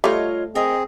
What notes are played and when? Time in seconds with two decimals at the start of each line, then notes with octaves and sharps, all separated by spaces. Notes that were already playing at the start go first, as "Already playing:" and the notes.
0.04 G3 A3 F4 C#5 D#5
0.55 C4 D#4 G#4 A#4